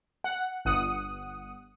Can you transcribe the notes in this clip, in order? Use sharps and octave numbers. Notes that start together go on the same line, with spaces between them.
F#5
G1 F#5 D#6